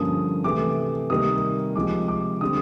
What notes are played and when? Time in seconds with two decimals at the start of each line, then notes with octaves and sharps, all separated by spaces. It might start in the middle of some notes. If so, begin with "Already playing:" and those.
Already playing: G2 D3 F3 A#3 C#4 D#6
0.44 C3 E3 A3 D6
1.10 C3 D#3 G3 A#3 D#6
1.75 C3 F3 G#3 D6
2.08 D6
2.41 D3 G3 C4 D#6